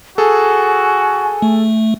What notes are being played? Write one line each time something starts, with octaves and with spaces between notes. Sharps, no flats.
F#4 G#4 A4 G#5
A3